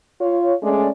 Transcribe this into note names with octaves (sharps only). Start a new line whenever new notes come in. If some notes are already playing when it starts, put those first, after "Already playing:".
F4 C#5
G#3 A3 C#4 D5